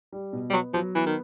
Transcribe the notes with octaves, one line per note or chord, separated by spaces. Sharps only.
G3
B2
G3
F#3 B3
F3 F#3
E3 B3
D#3